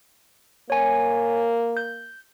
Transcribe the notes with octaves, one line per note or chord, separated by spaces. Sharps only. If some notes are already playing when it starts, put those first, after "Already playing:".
A#3 C#5 G#5
G6